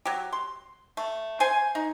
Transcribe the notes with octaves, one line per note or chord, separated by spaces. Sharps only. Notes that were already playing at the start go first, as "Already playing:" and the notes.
F#3 G4
C6
A3
C5 G#5
D#4